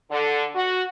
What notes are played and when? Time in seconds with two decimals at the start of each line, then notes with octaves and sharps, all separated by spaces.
0.11 D3
0.55 F#4